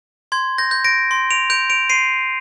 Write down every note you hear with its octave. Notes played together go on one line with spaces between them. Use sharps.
C6 G#6
G6 A#6
G6
A#6 D7
C6
D7 F7
G6 D7 F7
D7 F7
C6 C7 D#7